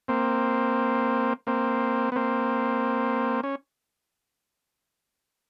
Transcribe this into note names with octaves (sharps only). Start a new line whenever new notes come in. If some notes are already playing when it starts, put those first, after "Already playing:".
A#3 C4
A#3 C4
B3
A#3 C4
C#4